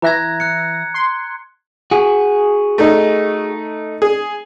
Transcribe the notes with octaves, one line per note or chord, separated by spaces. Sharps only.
E3 E5 A#5 F#6 G#6 A#6
F#6 C#7
C6
F#4 G#4
A3 D#4
G#4